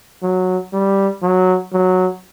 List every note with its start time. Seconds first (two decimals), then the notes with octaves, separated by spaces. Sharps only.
0.23 F#3
0.73 G3
1.23 F#3
1.73 F#3